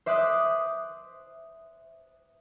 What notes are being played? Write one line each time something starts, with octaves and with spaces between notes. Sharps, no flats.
C5 E5 D6 D#6 F#6